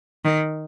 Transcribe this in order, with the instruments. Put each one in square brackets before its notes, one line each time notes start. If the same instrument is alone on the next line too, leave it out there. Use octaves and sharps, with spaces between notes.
[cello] D#3